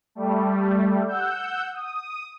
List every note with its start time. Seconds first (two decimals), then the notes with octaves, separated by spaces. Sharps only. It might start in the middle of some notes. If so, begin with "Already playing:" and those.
0.15 G3 A3
1.08 F#5 E6 G6
1.73 D#6